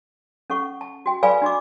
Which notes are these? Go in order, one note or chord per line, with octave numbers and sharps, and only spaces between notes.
C#4 A4 F#5 C#6
A5
F#4 G5
A4 B4 D5 F5 G#5 B5
D4 F#4 D#5 D6